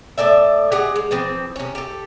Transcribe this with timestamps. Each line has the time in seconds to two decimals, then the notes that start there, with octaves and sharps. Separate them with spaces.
0.18 A2 A4 D5 E5
0.72 G4 G#4 D#5 F#5
0.96 G#3
1.11 E3 F3 C4
1.56 C3 C#4
1.75 G4 A4